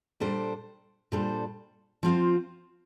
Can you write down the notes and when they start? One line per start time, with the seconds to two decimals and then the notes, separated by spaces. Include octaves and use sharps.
0.20 A#2 G3 D4 A4 C5
1.12 A#2 G3 D4 A4 C5
2.03 F3 C4 F4 C5